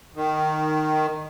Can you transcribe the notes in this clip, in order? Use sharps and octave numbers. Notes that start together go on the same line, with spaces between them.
D#3